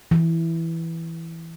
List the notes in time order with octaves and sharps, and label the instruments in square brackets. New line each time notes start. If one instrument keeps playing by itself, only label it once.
[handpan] E3